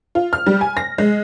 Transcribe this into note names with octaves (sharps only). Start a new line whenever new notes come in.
F4
F6
G3
G#5
A#6
G#3